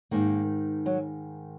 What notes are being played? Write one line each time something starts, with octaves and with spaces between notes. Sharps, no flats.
G#2 D#3 A#3
F#3